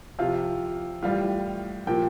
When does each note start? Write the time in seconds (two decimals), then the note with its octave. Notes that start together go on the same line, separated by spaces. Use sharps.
0.19 C3 F3 F4 F5
1.03 A2 E3 G3 F4 F5
1.87 A#2 F3 G4 G5